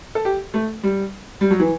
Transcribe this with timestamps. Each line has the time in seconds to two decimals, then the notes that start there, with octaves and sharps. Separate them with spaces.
0.15 A4
0.25 G4
0.54 A3
0.83 G3
1.41 G3
1.51 F#3
1.60 E3